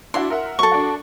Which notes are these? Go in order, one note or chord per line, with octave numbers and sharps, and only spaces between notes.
D4 E4 F#4 C6
A#4 E5 F#5
F#3 A4 C#6
D4 F#4